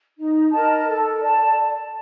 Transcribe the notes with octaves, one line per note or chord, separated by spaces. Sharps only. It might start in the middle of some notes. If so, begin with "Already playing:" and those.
D#4
A#4 D#5 A5
A4
D5 A5